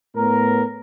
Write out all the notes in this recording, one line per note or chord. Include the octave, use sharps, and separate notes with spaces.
A2 B3 A#4